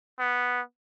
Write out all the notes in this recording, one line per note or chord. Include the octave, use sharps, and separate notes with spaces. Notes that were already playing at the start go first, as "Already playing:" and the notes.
B3